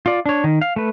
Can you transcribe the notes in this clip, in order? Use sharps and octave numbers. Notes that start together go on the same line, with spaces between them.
F4 D5
D4 C#5
D#3
F5
A3 B4